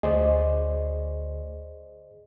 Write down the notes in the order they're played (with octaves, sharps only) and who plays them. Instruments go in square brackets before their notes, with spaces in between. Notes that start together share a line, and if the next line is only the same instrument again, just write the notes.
[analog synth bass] D2 [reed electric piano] G#4 C5 D5 [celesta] D#5